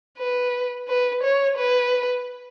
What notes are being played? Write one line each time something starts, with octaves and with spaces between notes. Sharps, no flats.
B4
B4
C#5
B4